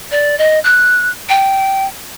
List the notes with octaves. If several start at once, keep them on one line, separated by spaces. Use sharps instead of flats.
D5
D#5
F#6
G5